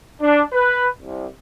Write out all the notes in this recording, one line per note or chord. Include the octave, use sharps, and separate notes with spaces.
D4
B4
C2